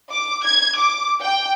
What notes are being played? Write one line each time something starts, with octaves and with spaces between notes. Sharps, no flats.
D6
G#6
D6
G5